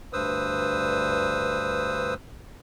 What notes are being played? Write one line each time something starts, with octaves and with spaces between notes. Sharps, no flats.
D2 G2 B4 C5 D#6 E6